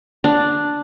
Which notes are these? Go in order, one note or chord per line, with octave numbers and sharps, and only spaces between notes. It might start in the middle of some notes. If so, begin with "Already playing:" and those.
D4